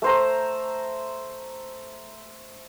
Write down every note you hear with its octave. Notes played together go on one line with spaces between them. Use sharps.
A3 C5 A#5